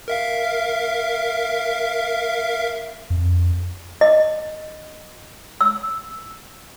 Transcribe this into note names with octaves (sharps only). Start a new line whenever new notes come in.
A#4 E5 F5
F2
D#5
E6